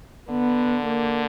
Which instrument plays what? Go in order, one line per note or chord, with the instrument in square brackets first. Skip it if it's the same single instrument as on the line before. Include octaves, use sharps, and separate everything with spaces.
[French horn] D3 [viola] B3
[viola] A#3